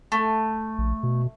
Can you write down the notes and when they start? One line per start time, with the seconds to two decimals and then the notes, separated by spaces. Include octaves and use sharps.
0.12 A3
0.78 A#1
1.03 B2